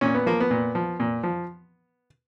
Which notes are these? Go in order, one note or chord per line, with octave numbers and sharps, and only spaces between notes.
A#2 C#4
B3
F3 A#3
B3
A#2
F3
A#2
F3